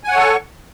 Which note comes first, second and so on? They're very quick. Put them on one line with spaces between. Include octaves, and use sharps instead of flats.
G#5 F#5 C#5 A4 C#6